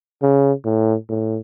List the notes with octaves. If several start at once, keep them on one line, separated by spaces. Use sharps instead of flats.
C#3
A2
A2